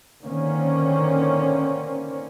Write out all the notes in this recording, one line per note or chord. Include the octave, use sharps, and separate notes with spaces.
D3 D#3 A#3 C4 C#4